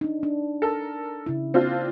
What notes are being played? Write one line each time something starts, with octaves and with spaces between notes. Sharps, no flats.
D4 D#4
D4
A4 A#4
C#3 E4
A#3 C4 D4 F4